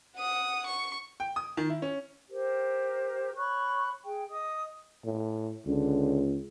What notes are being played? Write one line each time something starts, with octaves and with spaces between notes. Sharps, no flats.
F#5 D#6
C#6
G5
D#6
D#3
E4
C#4
G4 A#4 C5
C#5 B5 C#6 F#6
G#4 G5
D#5 D#6
A2
C#2 D3